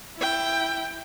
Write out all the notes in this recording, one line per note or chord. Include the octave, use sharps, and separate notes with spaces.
E4 G5